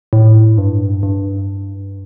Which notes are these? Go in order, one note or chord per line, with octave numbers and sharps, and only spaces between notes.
A2
G2
G2